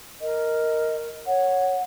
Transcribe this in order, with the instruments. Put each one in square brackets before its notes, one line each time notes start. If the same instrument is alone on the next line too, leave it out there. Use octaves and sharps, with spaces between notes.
[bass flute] A#4 [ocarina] D#5
[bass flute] C#5 [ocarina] F#5